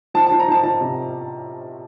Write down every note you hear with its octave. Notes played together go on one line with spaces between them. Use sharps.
F3 A5
A5
F3
A#5
F3 A5
F3 A5
C3